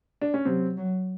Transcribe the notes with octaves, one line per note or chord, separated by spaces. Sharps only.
D4
C#4
C3 F#3 C4
F#3